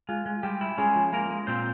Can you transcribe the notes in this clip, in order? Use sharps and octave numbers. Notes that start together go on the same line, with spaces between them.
G#3 F4
G#3
G3 G#3 G4
E4
G#3 C#4 G#4
F3
G#3 A#3 A#4
G#3
A#2 C4 C5